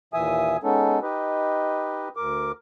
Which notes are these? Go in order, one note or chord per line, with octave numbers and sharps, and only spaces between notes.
D#2 A#2 E3 E5 G#5 D#6
G#3 B3 C#4 D#4 A4
D#4 G4 B4 D#5
D2 A#4 D6